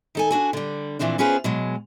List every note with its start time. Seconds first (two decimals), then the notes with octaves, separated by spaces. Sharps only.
0.15 D#3 A4 G#5
0.31 D4 F#4 G#5
0.53 D3 G3
0.99 A#2 E3 F3 C4 D4
1.18 B3 C#4 F4 G#4 B4 C5
1.44 B2 F#3 G#3